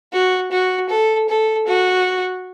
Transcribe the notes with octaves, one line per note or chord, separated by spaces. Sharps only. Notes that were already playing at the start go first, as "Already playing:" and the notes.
F#4
F#4
A4
A4
F#4